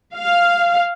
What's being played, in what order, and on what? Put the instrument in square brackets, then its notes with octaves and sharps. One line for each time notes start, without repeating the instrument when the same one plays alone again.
[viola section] F5